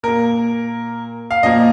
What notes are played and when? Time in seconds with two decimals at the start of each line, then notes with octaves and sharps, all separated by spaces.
0.03 A#2 A#3 A#4
1.31 F5
1.43 A#2 F3 A#3 D#5